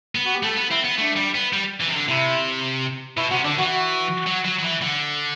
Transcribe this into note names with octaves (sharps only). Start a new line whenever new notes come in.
B3
F#4
G4
A3 A4
B3
C4 E4
B3
A3 D4
G3
B3
G3
E3
C3
D3
C3 E4
B2 E4
C3 F#4
D3 D4
E3 F#4
F#4
F#3
F#3
F#3
E3
D3